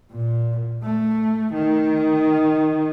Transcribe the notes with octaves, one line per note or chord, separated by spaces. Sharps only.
A#2
A3
D#3